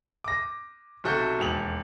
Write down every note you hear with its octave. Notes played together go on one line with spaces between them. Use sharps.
D6 A#6
B1 C3 F#4 A4 G6
E1 D#2 F7 F#7